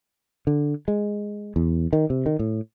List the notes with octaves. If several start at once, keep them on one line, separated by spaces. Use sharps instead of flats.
D3
G#3
E2
D#3
C3
D#3
A2